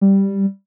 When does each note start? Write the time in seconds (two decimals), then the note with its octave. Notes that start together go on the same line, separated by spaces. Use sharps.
0.01 G3